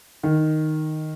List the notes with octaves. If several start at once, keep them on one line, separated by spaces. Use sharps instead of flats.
D#3